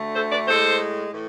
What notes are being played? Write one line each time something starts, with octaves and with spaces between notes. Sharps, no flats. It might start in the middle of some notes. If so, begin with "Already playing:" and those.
Already playing: D2 D3 A3
A4 C5
B4 D5
A2 G#3 A4 C5
A2 E3